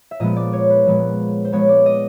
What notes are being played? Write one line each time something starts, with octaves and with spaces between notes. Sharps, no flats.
E5
A#2 F3 G#3 B3 D#5
D5
C#5
B4
A#2 F3 G#3 B3
C5
A#2 F3 G#3 B3 C#5
D5
D#5